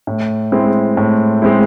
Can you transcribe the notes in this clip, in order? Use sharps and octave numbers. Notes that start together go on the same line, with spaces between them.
A2
G#3 C4 E4
A2
G#3 C4 E4